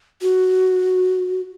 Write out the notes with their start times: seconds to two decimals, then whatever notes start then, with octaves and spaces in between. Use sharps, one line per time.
0.22 F#4